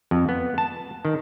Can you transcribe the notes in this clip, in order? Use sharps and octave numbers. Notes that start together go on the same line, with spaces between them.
F2
B3
A5
D#3